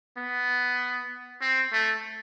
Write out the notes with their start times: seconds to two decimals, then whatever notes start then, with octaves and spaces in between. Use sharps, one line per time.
0.17 B3
1.41 C4
1.72 A3